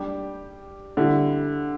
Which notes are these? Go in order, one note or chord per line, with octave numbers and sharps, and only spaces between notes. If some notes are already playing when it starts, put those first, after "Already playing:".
Already playing: G3 D4 G4
D3 G3 E4